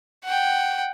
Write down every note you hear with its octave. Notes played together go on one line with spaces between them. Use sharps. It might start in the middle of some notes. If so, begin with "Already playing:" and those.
F#5 G5